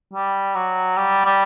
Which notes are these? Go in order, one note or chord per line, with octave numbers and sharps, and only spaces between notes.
G3
F#3
G3
G3